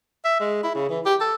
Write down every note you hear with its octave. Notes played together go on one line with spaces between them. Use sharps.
E5
G#3
E4
C#3
E3
G4
A4